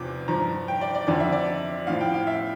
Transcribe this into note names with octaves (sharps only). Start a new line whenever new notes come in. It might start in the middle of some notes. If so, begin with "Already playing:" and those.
Already playing: E2 C3 F3 D6
G2 F3 A#5
G5
D5
D5
F2 D3 F3 D5
E5
D5
A2 F3 F5
G5
F5
E5